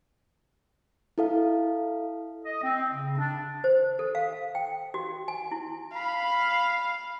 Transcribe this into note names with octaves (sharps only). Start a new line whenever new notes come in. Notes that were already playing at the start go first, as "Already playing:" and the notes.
E4 A4 F5
D#5
C4
C#3
D4
C5
A4
F5
G5
F#4
G#5
E4
F5 B5